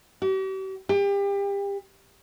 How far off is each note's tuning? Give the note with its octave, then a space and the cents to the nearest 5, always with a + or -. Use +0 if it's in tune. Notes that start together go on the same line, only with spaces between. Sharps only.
G4 -45
G4 +30